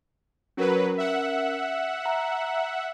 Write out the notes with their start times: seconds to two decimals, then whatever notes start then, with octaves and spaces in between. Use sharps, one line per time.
0.57 F#3 C#4 A#4 B4
0.98 E5 F#5
2.06 A#5